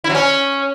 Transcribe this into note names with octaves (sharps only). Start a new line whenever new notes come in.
E4
F#3
C#4